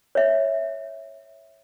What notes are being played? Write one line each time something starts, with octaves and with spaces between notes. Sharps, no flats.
C#5 E5